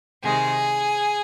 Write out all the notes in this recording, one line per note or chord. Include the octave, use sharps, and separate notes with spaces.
C3 D#3 G#3 G#4